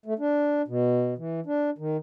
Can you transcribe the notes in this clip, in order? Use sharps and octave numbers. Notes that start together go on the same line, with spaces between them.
A3
D4
B2
E3
D4
D#3